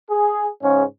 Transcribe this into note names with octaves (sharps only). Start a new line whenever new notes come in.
G#4
G#2 C#3 C#4